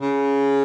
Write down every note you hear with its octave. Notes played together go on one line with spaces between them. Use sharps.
C#3